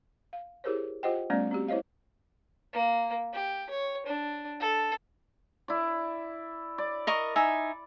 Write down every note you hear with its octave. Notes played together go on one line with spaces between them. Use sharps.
F5
E4 G4 G#4 A#4 C5 C#5
F4 G4 C5 D#5 F#5 G5
G3 A3 B3 C#4 D5
C4 F#4 G4
E4 C5 C#5 D#5 F5
A#3
G4
C#5
D4
A4
E4 D5
D5
A#4 D#5 C#6
D#4 E5 G#5